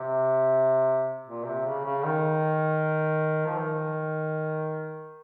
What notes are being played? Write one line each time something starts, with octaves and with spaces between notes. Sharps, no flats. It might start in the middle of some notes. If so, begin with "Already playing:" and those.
Already playing: C3
A#2
C3
C#3
C#3
D#3
F3
D#3